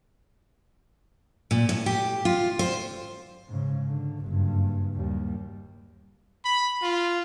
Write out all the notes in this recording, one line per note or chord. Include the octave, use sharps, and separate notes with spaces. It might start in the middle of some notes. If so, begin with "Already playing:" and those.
A#2
A2
G4
F4
C5
G#2 C#3
D3
F#1 G2
D#2 G3
B5
F4